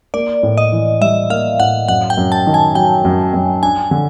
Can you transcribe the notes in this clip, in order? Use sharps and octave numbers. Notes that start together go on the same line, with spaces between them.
A#3 D5
A2
D#5
E3
G3 E5
A#3 F5
A2 F#5
F#2 F#5
G5
F#2
A5
D#3
G#5
F#3 G5
F#2
F#2
D4 G#5
D3